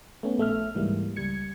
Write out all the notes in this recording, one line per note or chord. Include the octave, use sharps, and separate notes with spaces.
A3 B3 C#4
A#1 A3 E5 F6
C#2 G#2 E3 G3 G#3 A#3
C#2 G3 G#6 C#7